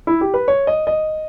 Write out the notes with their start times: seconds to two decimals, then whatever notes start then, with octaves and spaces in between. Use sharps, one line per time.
0.07 E4
0.21 G4
0.34 B4
0.48 C#5
0.67 D#5
0.87 D#5